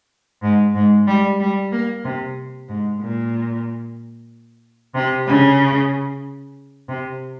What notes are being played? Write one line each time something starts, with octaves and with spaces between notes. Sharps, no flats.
G#2
G#2
G3
G3
A#3
C3
G#2
A#2
C3
C#3
C3